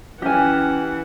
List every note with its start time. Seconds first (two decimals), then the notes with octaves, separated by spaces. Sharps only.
0.22 E3 C#4 G4 F#5 G#5